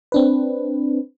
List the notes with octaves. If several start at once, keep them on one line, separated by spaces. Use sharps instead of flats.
C4 D4 B4